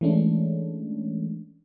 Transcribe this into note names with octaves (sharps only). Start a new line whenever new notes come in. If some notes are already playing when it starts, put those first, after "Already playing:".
E3 G#3 A3 C#4 D4